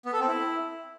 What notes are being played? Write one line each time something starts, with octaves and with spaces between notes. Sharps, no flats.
B3
A4
C4
E4